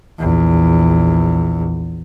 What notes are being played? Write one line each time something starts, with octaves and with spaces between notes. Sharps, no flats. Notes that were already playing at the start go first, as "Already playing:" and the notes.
A#1 E2